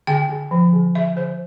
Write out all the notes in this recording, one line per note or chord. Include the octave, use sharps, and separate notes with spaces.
D3 G5
D3
F3
D3
D3 E5
D3 C5